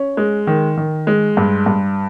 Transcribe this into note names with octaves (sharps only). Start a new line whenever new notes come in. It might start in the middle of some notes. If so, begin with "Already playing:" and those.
Already playing: C#4
G#3
D#3
D#3
G#3
G2
G2